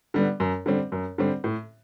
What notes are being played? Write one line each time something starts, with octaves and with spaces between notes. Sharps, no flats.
D3 G3 B3
F#2
D3 G3 C4
F#2
D3 G3 C4
A2